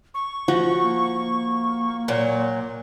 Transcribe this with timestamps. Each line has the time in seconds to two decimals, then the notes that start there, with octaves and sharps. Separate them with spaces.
0.14 C#6
0.48 F3 F#4
0.84 A#3
2.08 A#2 F#3